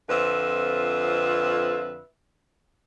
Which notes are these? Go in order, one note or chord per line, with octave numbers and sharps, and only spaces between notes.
F2 D3 C4 F4 B4 E5